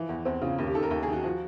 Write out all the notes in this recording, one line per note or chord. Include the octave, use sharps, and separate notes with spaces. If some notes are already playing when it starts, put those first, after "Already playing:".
Already playing: E3 F3
E2
E2 C4
C#3 F4
D#2
G4
D#3 A4
A#4
D#2
G#4
D#3 F#4
F3 F#4